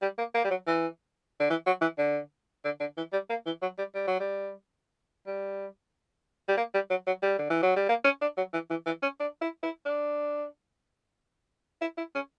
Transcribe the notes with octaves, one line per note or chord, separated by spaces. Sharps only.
G3
A#3
A#3
G3
F#3
E3
D3
E3
F#3
E3
D3
D3
D3
E3
G3
A#3
E3
F#3
G3
G3
F#3
G3
G3
G3
A#3
G3
F#3
F#3
G3
D3
E3
F#3
G3
A#3
C#4
D4
F#3
E3
E3
E3
C#4
D4
E4
E4
D4
E4
E4
C#4